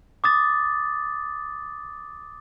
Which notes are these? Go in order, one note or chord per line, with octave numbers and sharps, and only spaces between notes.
D6 D#6 A6